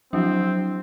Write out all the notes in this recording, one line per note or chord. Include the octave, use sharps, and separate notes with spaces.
F3 F#3 C4 D4 E4